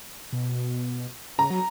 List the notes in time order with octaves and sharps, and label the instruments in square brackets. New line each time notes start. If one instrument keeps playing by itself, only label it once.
[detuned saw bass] B2
[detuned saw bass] C#3 [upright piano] A#5
[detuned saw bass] F#3